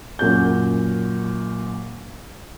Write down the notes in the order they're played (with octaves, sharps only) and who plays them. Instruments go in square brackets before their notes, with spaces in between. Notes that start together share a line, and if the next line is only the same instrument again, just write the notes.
[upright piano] F#2 A#2 F#4 G6